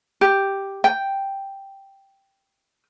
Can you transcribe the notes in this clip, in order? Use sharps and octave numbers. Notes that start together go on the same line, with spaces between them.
G4
G5